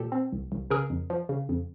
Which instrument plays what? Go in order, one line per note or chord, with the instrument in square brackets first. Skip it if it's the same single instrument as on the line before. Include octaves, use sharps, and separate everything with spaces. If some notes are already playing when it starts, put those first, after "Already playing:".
Already playing: [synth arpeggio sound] A#2 G4 A4
C4
C2
C2
C#3 G#4 A#4
F2
F3
C#3
F2